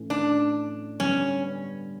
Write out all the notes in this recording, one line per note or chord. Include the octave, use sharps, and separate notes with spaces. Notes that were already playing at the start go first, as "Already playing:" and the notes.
Already playing: A2 E3 A3 C#4
D4
G2 D3 G3 B3 C#4